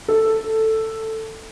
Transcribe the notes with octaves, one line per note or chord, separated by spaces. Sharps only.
A4